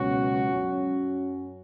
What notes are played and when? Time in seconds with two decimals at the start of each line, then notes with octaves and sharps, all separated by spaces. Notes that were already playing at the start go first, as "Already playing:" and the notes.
Already playing: C#2 B2 F#3 C#4 F#4
0.52 F#2 F#3 C#4